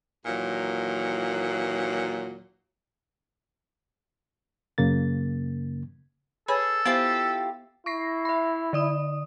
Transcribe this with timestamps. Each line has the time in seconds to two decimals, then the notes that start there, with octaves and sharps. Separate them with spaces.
0.26 D#2 A#2 E3 F#3
4.78 F#2 C#3 A#3 A6
6.48 G#4 A4 B4 C#5 B5
6.85 B3 E4 F4 G4 C5
7.86 E4 C#6 A#6 C7
8.25 E5 B5
8.73 D3 D5 D#6